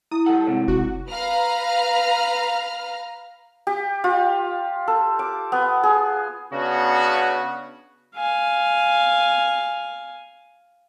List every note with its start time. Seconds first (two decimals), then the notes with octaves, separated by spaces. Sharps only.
0.11 E4 D#6
0.26 G3 A4 F#5
0.47 G#2 C3 G#4 C#5
0.68 F1 F#4
1.10 B4 F5 A#5 F6
3.67 G4
4.04 F4
4.88 A4
5.19 D6
5.52 B3
5.83 G#4
6.53 C#3 B3 D4 F#4
8.16 F5 G#5